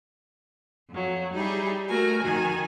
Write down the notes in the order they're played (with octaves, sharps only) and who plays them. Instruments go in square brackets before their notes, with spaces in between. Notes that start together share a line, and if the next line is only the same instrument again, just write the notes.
[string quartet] F2 F#3
[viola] G3 G4 [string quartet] D#4 E4 G#4
[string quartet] A3 G#5 [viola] F#4 A#4
[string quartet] F2 D#3 [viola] F#4 G#5